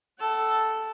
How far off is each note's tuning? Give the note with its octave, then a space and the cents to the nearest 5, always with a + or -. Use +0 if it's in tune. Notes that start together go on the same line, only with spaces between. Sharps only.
A4 +0 F#5 +40